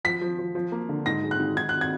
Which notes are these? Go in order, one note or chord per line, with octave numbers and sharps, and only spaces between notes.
F3 B6
F3
F3
F3
A#3
D3
G#2 A#6
G#3
F#6
D#3
D#3 G#6
F#6
G#6